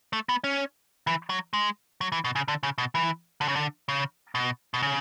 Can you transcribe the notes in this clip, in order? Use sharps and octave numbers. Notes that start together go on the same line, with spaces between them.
A3
B3
C#4
E3
F#3
G#3
F#3
E3
B2
C#3
D3
C#3
B2
E3
D3
C#3
D3
C#3
B2
B2
C#3